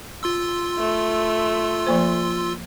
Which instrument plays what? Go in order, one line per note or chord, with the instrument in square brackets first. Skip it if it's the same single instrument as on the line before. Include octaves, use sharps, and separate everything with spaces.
[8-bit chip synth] F4 C6 E6
[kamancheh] A3
[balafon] F3 A#3 C5